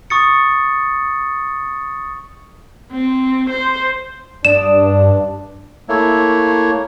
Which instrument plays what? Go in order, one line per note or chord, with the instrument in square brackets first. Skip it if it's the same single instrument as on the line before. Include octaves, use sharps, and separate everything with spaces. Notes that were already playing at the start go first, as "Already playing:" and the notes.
[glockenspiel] C#6 D#6 A6 C#7
[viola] C4
C5
[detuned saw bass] G2 [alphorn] D4 [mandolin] D5 D#6 [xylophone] E7
[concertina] A3 A#3 E4 C#5